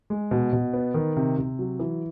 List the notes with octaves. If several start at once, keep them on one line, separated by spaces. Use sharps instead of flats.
G#3
B2
B2
B3
D#3
C3
C3
F#3
E3